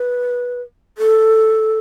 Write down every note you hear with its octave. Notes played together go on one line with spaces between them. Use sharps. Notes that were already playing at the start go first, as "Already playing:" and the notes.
Already playing: B4
A4